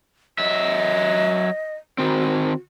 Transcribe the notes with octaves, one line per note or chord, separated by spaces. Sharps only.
F#3 D#5 E5
D#3 C4 F#4